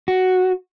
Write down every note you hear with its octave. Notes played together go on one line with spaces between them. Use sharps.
F#4